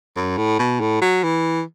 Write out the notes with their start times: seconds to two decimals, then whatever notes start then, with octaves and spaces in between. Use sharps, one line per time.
0.16 F#2
0.37 A2
0.59 B2
0.80 A2
1.02 F#3
1.24 E3